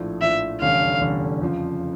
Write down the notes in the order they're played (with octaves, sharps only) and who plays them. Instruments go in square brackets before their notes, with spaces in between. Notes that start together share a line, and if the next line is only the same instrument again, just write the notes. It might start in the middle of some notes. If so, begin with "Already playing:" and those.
Already playing: [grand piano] A#1 A2 F3
[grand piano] A#1 A2 F3 [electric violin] E5
[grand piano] F1 E2 D3 G3 C#4 [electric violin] F5
[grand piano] F1 E2 D3 G3 C#4
F2 C#3 F3